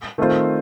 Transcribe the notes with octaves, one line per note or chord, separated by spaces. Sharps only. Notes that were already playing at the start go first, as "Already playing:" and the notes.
D#3 A3 C4 F4 C5